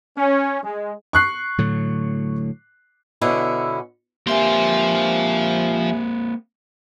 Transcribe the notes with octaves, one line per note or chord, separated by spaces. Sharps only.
C#4
G#3
C#6 F#6 C7
A2 D3 F#3
B2 D3 C#4 E4
F3 A#3 C4 G4 E5 G#5 C6